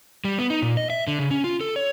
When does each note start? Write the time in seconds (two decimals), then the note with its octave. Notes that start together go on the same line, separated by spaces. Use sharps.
0.25 G3
0.39 B3
0.50 D#4
0.62 A#2
0.77 D#5
0.90 E5
1.07 D3
1.19 C#3
1.31 C#4
1.44 F4
1.61 A4
1.76 C#5